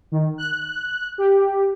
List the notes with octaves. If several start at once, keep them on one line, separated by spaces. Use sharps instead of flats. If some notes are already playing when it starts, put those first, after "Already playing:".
D#3
F#6
G4